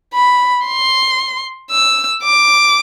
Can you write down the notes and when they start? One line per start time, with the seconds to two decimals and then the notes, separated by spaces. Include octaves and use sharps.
0.14 B5
0.66 C6
1.71 E6
2.24 D6